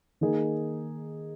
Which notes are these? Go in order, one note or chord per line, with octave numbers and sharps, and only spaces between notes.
D#3 A#3 D#4 G#4